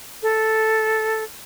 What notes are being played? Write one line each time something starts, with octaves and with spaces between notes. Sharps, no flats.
A4